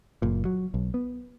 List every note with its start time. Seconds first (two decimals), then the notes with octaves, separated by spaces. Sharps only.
0.22 F#1 A#2
0.45 F#3
0.74 B1
0.94 B3